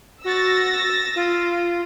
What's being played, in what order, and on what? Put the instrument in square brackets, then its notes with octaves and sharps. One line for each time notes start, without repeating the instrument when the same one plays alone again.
[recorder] F#4 [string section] E6 A6 A#6
[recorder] F4